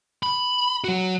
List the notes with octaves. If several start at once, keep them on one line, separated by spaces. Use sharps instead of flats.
B5
F#3 F#4